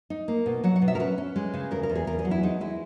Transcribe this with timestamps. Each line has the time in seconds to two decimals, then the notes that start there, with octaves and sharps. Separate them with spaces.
0.10 D#4
0.28 A#3
0.46 B2
0.64 F#3 F#5
0.76 F#5
0.82 B2
0.88 E5
0.95 A#4
0.99 C#4 B4
1.18 C#4
1.36 G#3
1.54 C#3
1.71 E2 A#4
1.83 A#4
1.90 E2
1.95 G#4
2.07 E2 A#4
2.19 G#4
2.25 F#3
2.31 E4
2.43 G#3 D#4
2.61 G#3 E4